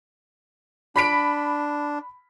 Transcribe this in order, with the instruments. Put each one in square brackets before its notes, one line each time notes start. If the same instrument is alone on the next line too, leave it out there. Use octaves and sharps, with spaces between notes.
[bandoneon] D4 [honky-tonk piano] B5 B6 D7